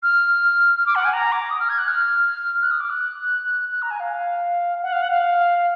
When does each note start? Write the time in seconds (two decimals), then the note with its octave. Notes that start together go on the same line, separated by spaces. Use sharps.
0.03 F6
0.77 F6
0.86 D6
0.95 F#5
1.05 G#5
1.13 A#5
1.32 D6
1.50 D#6
1.60 F6
1.69 G#6
1.78 F#6
1.88 F6
2.61 F#6
2.71 D#6
2.80 D6
2.90 F#6
3.72 F#6
3.82 A#5
3.90 G#5
4.00 F5
4.82 F#5
4.92 F5
5.02 F#5
5.11 F5